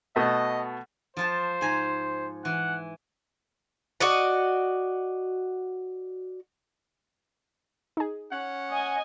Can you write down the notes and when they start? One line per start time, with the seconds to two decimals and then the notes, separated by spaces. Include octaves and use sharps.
0.16 B2 A3 B3 D#5
1.17 F3 F4 C5 A5
1.61 G#2 G#5 A#5
2.45 E3 F#5
4.00 F#4 D5 D#5 F#5
7.97 D#4 G#4
8.32 C#4 F#5
8.71 D#5 G#5